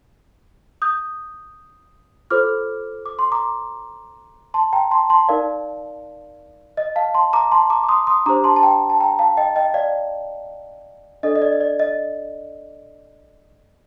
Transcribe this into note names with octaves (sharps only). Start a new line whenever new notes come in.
D#6 G6
F4 A4 C5 D6 F6
D6
C6
A#5 D6
A5 C6
G5 A#5
A5 C6
A5 C6
D#4 A#4 D5 F5
D#5
F5 A5
A5 C6
A#5 D6
A5 C6
A#5 D6
D6
C6 D#6
C6 D#6
D4 G4 C5 A#5 D6
A5 C6
A5
G5 A#5
A5
G5 A#5
F5 A5
D#5 G5
D#5 G5
D5 F5
D4 A4 D5 D#5
D#5
D5
D#5
D5
D#5